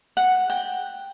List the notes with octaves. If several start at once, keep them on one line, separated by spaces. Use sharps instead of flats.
F#5
G5